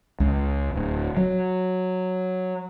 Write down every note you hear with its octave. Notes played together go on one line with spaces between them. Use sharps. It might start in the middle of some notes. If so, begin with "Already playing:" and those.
C#2
D1
F#3